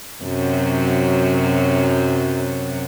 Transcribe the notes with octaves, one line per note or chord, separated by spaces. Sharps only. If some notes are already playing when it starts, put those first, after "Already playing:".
F#2 C3 F#3